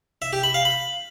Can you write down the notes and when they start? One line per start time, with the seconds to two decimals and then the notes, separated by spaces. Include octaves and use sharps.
0.22 E5
0.33 G4
0.43 B5
0.54 F5
0.65 B5